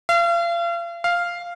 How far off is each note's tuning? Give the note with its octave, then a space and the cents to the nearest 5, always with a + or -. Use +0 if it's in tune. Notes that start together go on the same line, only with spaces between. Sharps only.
F5 -40
F5 -5